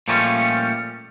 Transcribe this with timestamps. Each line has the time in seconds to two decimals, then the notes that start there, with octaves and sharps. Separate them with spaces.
0.08 A#2 F3 G3 A3 C#4